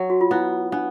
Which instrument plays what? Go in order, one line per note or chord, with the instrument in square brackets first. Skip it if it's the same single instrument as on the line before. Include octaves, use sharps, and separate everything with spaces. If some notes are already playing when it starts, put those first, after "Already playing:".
Already playing: [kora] F#3
[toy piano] F#4
F4
[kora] B3 [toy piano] E4
[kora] B3 [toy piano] D4